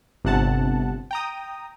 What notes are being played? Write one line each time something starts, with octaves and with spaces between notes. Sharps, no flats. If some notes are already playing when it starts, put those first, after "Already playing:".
G1 C3 F#5 A5
G5 A#5 D#6